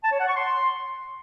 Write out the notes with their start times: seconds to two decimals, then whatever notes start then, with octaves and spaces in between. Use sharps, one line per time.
0.03 A5
0.12 C#5
0.20 F#5
0.28 C#6
0.36 C6